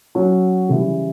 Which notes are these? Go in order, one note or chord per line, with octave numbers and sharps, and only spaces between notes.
F#3 C#4 F#4
C#3 E3 G3